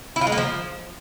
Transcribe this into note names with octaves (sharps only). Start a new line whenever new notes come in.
E4
F4
G#3
A#3
F3